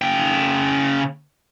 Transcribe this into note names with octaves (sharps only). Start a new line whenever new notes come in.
C#3 G5